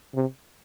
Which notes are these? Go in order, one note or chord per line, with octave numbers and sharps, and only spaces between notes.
C3